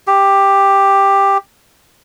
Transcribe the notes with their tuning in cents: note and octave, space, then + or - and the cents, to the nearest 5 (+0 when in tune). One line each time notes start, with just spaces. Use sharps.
G4 +10